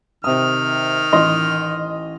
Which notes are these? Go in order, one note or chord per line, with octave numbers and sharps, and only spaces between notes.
C3 D#3 D#6 F6
A1 D#5 C6